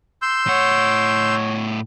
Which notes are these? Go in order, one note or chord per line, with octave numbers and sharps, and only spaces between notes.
C6 E6 G6
A2 C#5 F#5